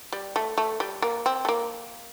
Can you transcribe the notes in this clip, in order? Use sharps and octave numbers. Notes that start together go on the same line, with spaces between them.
G3
A3
A3
G3
A#3
C4
A3
A#3